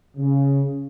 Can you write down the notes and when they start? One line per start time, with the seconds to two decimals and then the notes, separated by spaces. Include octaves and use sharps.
0.17 C#3